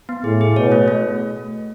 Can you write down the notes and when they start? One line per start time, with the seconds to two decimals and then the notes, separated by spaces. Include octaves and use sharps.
0.09 B3
0.24 A2 G#4
0.41 G#4
0.56 B2 C#5
0.72 A3
0.88 A3